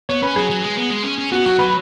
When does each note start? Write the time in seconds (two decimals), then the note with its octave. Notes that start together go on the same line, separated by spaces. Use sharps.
0.09 B3 C#5
0.23 C#4 B4
0.36 F#3 G#4
0.50 F#3
0.63 G#3
0.77 B3
0.91 G#3
1.04 C#4
1.18 C#4
1.32 B3 F#4
1.45 F#3 F#4
1.59 F#3 B4